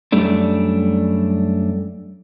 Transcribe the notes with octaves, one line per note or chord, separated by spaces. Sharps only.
F#2 G3 A3 D4